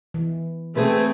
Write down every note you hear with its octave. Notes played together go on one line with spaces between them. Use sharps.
E3
A3 C4 G#4 B4 C5